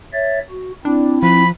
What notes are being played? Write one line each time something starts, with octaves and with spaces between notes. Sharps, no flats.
C#5 E5 A6
F#4
C4 D4 E4
F3 B5